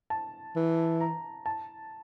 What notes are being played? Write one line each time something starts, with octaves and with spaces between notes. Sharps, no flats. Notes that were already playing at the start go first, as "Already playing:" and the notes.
A5
E3
A#5
A5